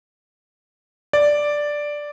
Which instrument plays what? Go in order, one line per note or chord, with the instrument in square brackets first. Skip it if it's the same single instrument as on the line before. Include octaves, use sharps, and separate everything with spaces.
[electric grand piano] D5